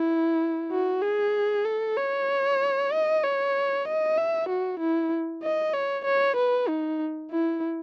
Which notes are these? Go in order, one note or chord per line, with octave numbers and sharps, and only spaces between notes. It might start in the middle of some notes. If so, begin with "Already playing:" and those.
Already playing: E4
F#4
G#4
A4
C#5
D#5
C#5
D#5
E5
F#4
E4
D#5
C#5
C#5
B4
D#4
E4